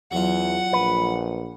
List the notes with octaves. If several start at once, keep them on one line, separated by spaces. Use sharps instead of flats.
E2 F#3 F4 F#5
A#1 B4